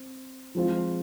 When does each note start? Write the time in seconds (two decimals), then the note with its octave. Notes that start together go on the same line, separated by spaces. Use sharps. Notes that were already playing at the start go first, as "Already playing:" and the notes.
Already playing: C4
0.55 F3 G#3 C4 F4